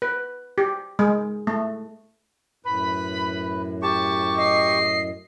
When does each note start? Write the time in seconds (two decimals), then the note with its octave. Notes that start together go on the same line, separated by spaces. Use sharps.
0.02 B4
0.58 G4
0.99 G#3
1.47 A3
2.65 F#2 A2 B4 B5
3.82 G4 A5 C#6
4.38 D#5 C7